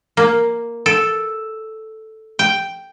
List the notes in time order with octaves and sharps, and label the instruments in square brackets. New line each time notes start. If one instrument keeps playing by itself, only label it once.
[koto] A#3
A4
G5